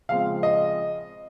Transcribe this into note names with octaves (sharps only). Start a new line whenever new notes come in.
C#3 F3 G#3 C4 F5
D#5